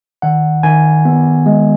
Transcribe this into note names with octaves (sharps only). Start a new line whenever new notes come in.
D#3 F#5
D#3 G#5
B3
G#3